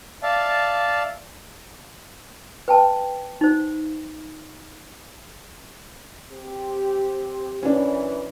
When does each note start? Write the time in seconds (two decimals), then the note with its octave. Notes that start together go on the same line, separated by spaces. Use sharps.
0.23 D5 E5 F5 A5
2.68 B4 G5 A5
3.41 D#4 C5
6.31 C4 G4
7.63 F#2 E3 C#4 D4